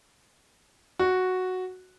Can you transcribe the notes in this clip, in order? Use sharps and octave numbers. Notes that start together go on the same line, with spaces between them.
F#4